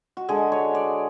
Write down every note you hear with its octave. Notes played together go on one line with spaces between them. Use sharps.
F#4
D3 G#3 G#4
C#5
D5